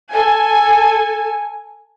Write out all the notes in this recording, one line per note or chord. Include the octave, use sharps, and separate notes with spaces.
A4 G#5